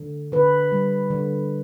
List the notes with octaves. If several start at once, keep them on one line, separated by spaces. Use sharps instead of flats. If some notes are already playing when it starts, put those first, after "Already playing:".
Already playing: D3
D3 B4
G3
D3